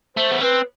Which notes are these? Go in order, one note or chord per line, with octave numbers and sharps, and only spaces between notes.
A3 C5
B3
C4 B4